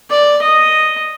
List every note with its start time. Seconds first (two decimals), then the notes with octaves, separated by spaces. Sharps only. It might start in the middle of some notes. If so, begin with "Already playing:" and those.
0.11 D5
0.42 D#5